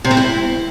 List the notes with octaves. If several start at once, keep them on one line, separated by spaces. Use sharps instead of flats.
C3
C4
E4